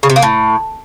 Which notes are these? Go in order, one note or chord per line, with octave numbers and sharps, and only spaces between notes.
C#3
C3
A#3
A2